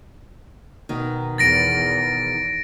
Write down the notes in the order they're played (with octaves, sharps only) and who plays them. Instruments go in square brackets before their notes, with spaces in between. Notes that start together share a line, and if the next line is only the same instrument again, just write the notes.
[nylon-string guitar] B2 D#3
[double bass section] E2 [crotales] A6 A#6 D7